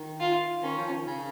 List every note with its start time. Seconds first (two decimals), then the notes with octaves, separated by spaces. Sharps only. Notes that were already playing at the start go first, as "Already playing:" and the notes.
Already playing: D#3
0.20 F4
0.63 D#3 C#4
0.78 F3
0.92 D#3
1.07 C#3